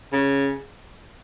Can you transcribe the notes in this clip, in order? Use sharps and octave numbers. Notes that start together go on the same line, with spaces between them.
C#3